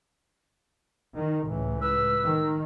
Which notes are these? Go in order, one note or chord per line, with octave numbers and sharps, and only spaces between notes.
D#3
C#2 A2 E3
B4 E6
D#3